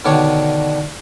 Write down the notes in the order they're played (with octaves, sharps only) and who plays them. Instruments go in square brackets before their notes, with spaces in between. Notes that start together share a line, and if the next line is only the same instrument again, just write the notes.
[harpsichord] B2 D3 D#3 D4 C#5